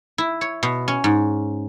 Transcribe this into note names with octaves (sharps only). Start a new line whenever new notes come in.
E4
C#5
B2
C#4
G#2